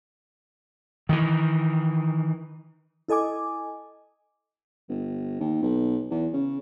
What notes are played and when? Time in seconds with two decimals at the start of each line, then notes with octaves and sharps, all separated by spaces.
1.09 D#3 E3
3.08 E4 A4 D#5 G#5 D6
4.89 G1
5.40 D#2
5.62 B1
6.11 E2
6.33 C#3